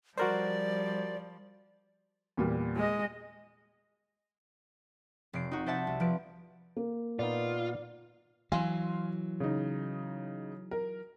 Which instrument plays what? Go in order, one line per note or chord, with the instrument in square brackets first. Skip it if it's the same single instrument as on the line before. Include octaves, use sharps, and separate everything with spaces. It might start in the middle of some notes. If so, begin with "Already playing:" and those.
[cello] F3 G3 [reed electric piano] F#4 A#4 C5 [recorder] D5
[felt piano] E2 A#2 G3
[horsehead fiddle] G#3 D#5
[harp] F1 C7 D7
D#4 F#4
C5 D5 E5 F#5 A5
C2
F3 B4 D7
[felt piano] A#3
[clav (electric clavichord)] A#2 B3 D#4 [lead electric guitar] F4 [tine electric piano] D5
[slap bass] E3 F#3 [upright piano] F5 G#5 C6
[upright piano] C#3 D#4
A#4